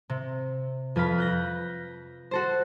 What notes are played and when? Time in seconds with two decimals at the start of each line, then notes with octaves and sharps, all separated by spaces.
0.10 C3
0.96 F2 B4 F5 B5
1.18 F#6 G6 A#6
2.31 F#4 A4 C5